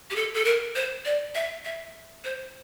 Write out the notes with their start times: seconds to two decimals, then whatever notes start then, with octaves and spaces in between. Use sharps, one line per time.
0.11 G4
0.16 A4
0.34 A4
0.45 A#4
0.75 C5
1.05 D5
1.35 E5
1.65 E5
2.24 C5